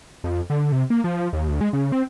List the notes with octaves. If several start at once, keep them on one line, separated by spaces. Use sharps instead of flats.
F2
D3
C3
A#3
F3
D#2
D2
G#3
C#3
C4